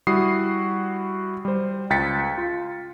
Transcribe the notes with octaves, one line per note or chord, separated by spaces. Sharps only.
G3 E4 F#4 D#6 C7
G3 C5
C#2 G5 A6 B6 C#7
F4